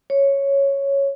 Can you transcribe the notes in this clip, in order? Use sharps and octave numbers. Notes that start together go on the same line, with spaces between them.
C#5